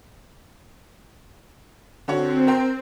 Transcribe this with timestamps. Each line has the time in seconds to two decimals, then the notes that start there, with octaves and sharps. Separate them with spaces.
2.08 D3 C4 F#4 C#5
2.47 A#4 G5 C6